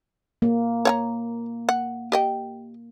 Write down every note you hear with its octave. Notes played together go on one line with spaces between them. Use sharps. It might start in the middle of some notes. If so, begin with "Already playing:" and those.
A#3
C#5 F#5 A#5
F#5
G4 D#5 G5